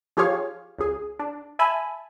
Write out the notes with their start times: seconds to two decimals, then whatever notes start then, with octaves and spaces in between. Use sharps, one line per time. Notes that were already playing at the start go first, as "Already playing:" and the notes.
0.17 F3 F4 G4 G#4 C#5 F5
0.79 C#2 G#4
1.19 D4
1.59 E5 G#5 A5 B5